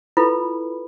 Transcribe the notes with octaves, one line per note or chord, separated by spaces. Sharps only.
E4 F4 A4 B4 B5